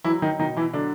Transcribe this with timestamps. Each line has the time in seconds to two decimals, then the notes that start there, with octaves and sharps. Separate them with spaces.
0.05 E3 F#3 E4
0.22 D#3 D#4
0.39 B2 D#3 D#4
0.57 E3 E4
0.74 D3 F#3 D4